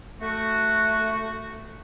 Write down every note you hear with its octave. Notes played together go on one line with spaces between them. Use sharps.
A3 F#4